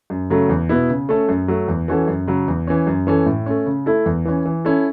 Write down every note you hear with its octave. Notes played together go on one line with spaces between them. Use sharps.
F#2
C#3 F#3 A3
E2
B2 B3 E4
C#3
A3 C#4 A4
F#2
F#3 A3
E2
E3 C#4 F#4 A4
F#2
C#3 F#3
E2
E3 C#4
F#2
E3 C#4 A4
A2
A3 C#4
C#3
A3 E4 A4
E2
E3 C#4
E3
C#4 E4 A4